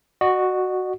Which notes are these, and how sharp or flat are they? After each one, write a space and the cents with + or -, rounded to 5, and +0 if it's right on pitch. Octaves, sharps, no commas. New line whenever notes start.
F#4 +0 D#5 -45